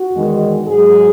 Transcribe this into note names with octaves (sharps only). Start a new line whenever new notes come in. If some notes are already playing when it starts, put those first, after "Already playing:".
Already playing: F#4
E2 D#3 G#3
G#2 F#3 G#4